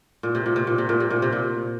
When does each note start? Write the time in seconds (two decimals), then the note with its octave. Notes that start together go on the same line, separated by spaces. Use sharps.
0.23 A#2
0.35 C3
0.46 A#2
0.56 C3
0.67 A#2
0.78 C3
0.89 A#2
1.00 C3
1.10 A#2
1.22 C3
1.32 A#2